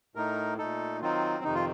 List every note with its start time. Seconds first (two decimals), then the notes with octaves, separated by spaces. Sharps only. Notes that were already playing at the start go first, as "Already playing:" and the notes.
0.15 A2 A3 D#4 A#4
0.58 A#2 A3 D#4 A4
1.01 D#3 F#3 C4 D#4 F4
1.44 F2 C3 D#3 D#4
1.55 F4